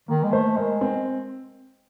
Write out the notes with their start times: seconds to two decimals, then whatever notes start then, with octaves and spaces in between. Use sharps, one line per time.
0.08 D#3 A#3
0.24 G#3
0.32 A3 C5
0.57 G#3 A#4
0.81 C4